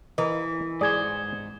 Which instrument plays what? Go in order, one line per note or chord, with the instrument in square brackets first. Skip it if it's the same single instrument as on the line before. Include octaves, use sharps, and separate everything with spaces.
[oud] E3 [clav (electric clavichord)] A#4 D#5
[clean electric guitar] G#2 C5 [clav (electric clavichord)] G#4 D5 [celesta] D#6 G#6